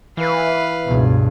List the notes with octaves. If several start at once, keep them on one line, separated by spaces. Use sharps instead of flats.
E3 B4 F5
C#2 G2 B2